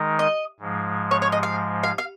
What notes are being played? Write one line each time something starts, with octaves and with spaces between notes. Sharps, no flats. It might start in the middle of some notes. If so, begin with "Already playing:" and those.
Already playing: D#3 G#3 D#4 A#4
D#5
G#2 F3 G#3
C#5
C#5
D#5
F5
F5
F5